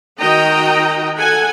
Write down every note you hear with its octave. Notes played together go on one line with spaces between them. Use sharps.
D#3 F#4 D#5 G5 A#5
A4 F#5 G#5